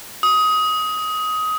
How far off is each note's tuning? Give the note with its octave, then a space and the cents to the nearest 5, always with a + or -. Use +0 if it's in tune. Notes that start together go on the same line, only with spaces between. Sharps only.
D#6 +20